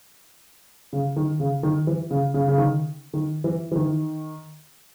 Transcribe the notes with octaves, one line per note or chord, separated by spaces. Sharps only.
C#3
D#3
C#3
D#3
E3
C#3
C#3
C#3
D#3
D#3
E3
E3
D#3